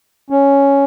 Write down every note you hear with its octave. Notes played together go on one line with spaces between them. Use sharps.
C#4